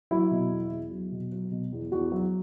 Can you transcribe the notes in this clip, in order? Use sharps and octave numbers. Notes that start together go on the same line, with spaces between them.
F#3 E4
B2
E2
E2
F#3
B2
F#3
B2
E2
E2 F#4
F#3